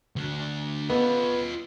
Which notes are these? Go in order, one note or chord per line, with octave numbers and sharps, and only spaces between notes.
D2 D4
B3 F4 D#5